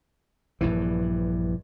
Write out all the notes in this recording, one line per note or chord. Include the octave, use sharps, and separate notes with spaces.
A#1 G2 E3